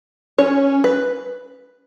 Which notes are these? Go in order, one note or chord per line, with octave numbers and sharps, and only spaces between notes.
C#4 C#5
B4